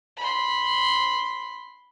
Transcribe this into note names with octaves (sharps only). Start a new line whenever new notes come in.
B5 C6